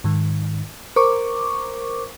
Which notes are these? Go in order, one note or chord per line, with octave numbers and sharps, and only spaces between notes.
G#2 D#3
A#4 C5 C#6 D6